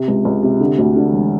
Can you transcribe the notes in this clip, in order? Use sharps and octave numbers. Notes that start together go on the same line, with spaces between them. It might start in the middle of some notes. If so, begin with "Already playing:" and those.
Already playing: C3
C#2
C#2
C3
D3
D2
D3
E1